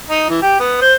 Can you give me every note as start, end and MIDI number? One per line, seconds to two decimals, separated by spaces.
0.10 0.26 63
0.29 0.39 52
0.42 0.59 67
0.60 0.81 59
0.82 0.95 72